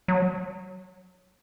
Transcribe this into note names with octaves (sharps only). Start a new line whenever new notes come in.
F#3